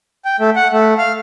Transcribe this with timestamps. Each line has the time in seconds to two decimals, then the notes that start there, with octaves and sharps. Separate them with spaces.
0.25 G5
0.40 A3
0.56 F#5
0.72 A3
0.98 F5